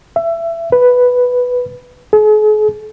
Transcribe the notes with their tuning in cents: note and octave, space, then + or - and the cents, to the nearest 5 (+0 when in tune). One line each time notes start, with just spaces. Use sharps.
E5 +25
B4 +0
G#4 +45